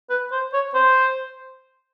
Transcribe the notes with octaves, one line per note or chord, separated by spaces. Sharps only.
B4
C5
C#5
C5